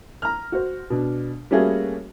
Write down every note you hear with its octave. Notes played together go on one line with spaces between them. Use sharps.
A#5 F6
F#4 C5
B2 D4
G3 A3 A#3 C#4 F#4 G#4